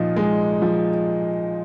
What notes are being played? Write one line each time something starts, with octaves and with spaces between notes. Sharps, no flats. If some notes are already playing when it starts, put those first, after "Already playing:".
Already playing: A#2 F3 D#4
G#3
F3